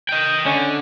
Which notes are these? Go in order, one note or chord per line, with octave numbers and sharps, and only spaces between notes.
D#5 G5
D3 C#4